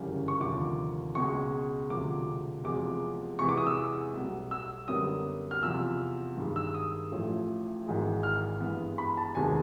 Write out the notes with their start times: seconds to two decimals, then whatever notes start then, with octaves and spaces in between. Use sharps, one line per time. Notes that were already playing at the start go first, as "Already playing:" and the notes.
Already playing: G1 F#2 C#3 E3 G3
0.28 C#6
0.41 F1 D#2 D3 F3 D6
1.15 C#2 B2 G#3 C#6
1.90 E1 D2 C3 F3 D6
2.64 F1 E2 C3 F3 G#3 D6
3.39 E2 C3 E3 G#3 B3 C#6
3.49 D6
3.57 D#6
3.67 E6
4.13 B1 B2 G3 B3
4.51 E6
4.88 F#2 D3 G3 B3 D#6
5.51 F6
5.63 E2 C3 F3 E6
6.37 G2 D#3 G#3
6.56 E6
6.74 D#6
7.12 A1 A2 F3 A3
7.86 G#1 G#2 E3 G#3
8.23 F6
8.60 G2 E3 G#3 B3
8.98 B5
9.17 A5
9.35 F1 D#2 D#3 G#3 B3 G#5